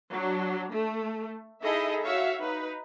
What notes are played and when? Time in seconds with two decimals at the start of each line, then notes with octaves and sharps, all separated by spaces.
0.12 F#3 D4
0.72 A3
1.63 D#4 E4 G#4 A4 D#5 E5
2.02 F#4 C#5 E5 F5
2.41 D#4 B4